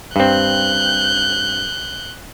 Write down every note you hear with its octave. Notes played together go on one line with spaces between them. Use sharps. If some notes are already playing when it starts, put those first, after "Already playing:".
G2 C4 F#6 G6